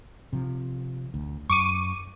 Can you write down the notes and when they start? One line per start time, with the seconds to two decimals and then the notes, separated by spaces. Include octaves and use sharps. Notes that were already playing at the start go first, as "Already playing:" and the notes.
0.33 C3 F3
1.14 D2
1.50 F#2 C#6 D6 D#7